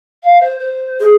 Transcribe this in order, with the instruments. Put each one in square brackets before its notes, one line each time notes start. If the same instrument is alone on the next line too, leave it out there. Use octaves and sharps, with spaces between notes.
[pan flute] F5
C5
C5
[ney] G#4